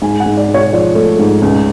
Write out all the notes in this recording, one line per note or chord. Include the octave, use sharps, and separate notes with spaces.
G#2 G#5
F#5
G#2
D5
G#2
C#5
F3 D5
A3
G#2
C#2